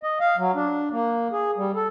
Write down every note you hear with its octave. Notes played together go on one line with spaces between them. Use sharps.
D#5
F5
F#3
D4
A#3
G#4
G3
A4